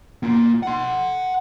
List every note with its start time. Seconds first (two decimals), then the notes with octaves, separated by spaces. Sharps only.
0.23 A#3 F4
0.63 F#5 C6